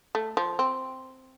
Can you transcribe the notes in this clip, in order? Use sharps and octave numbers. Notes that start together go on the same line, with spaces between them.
A3
F3
C4